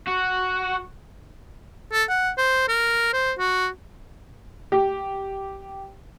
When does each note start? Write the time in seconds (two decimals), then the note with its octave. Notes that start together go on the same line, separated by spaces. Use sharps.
0.08 F#4
1.93 A4
2.09 F#5
2.38 C5
2.69 A#4
3.14 C5
3.39 F#4
4.72 G4